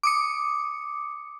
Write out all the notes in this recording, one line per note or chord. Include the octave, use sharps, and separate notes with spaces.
D6 D#6 C#7